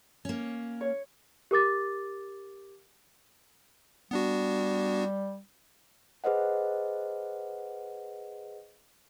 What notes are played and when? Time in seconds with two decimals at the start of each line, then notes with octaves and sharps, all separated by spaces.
0.25 A#3 C#4
0.81 C#5
1.51 G4 A#4 D6 A6
4.11 G3 B3 D4 F#4
6.24 G#4 B4 C5 D#5 F#5